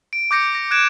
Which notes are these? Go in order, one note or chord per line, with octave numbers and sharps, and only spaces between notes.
D7
D6 G6 A#6 C#7
A#6
F#6 G#6 D7 E7